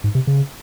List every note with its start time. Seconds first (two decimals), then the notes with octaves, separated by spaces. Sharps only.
0.04 G#2
0.15 C3
0.27 C#3